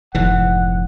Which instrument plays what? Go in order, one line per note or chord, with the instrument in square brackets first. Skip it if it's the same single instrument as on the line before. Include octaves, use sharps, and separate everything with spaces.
[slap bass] F1 G#2 E3 [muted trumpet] F#5